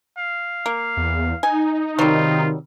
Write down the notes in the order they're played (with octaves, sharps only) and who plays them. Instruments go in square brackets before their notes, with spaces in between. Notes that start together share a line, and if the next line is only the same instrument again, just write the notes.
[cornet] F5
[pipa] A#3
[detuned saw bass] E2
[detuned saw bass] D#4 [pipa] G#5
[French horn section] C3 D#3 [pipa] F#3 G3 [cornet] F4